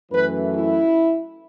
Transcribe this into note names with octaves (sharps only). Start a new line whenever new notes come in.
F#2 E3 A3 B4
E4